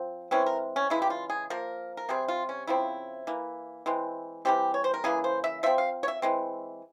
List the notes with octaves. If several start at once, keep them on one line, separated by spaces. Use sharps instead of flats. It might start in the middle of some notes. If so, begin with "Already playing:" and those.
Already playing: F3 C4
E3 G#3 C4 C#4
A#4
C#4
C#3 E3 G#3 E4
G4
F4
G#4
F3 A#3 A#4
A#4
C3 G3 C4 G#4
F4
C#4
C#3 F3 C4 E4
E3 A#3
E3 G#3 C4
E3 G3 C4 G4
C#5
C5
A#4
C#3 E3 A#3 G#4
C5
E5
F3 C4 E5
F5
C#5
E5
E3 G#3 C4